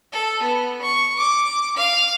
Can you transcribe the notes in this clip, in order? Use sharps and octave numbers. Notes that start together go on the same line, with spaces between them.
A4
B3
C#6
D6
F5